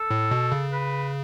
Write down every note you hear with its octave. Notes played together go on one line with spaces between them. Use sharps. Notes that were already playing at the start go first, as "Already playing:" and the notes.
Already playing: A4
A2
B2
C#3
B4